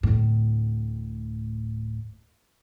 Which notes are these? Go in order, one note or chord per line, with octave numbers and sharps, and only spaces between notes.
D1 A2